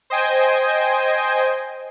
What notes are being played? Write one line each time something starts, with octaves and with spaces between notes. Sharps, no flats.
C5 D#5 G5 G#5